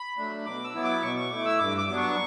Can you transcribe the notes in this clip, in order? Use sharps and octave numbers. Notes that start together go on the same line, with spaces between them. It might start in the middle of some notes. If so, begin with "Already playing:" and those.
Already playing: B5
F#3 A3 D4
B2 D6
E6
F#3 B3 E4
D6
B2 C#6
C#6
A3 E4 D6
E6
G2 D6
D6
F#3 B3 D4
C#6